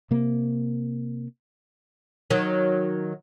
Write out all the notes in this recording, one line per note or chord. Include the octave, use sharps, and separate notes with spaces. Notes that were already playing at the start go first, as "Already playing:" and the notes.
C3 A#3
D#3 F#3